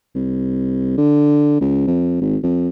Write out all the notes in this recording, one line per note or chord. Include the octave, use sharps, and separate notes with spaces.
C2
D3
C#2
F2
G#1
F2